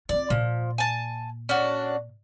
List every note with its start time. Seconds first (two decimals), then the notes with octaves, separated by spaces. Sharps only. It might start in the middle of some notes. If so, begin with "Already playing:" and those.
0.09 C4 F4 D5
0.30 A#2 F3
0.78 G#5 A5
1.49 C#4 D4 F#4